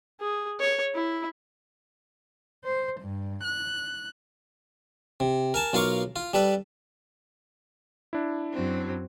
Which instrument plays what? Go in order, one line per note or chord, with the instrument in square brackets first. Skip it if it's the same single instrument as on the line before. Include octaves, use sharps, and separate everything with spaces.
[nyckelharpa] G#4
C#5
E4
[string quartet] C5
G2
F#6
[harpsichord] C3
A#4 G#5 A5
B1 F4 A#4 F5 C#6 D6
F4
G3 A4 B4
[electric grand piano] D4 E4
[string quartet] F#2 F#3 C4